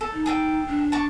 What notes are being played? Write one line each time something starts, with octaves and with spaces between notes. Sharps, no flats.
A4
D#4
G#4 A4 G5
D4
A5 C#6 D6